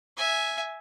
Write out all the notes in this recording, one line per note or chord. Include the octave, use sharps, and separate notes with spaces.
E5 G#5